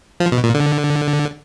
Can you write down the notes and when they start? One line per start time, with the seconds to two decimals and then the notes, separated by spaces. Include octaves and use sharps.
0.20 F3
0.32 B2
0.44 A#2
0.54 D3